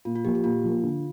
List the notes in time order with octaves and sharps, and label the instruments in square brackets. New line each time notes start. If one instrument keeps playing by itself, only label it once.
[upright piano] A#2 [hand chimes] F4
[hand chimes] F4
[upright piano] F3 A#3 [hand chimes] G4
[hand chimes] G4
[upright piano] A#2 [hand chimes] F4
[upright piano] F3 A#3
D3